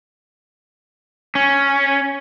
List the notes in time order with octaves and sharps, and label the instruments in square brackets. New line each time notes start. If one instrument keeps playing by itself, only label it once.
[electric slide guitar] C#4